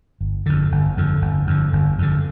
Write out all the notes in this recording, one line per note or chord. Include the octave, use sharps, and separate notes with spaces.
G1
F2 D3
G1
F2 D3
G1
F2 D3
G1
F2 D3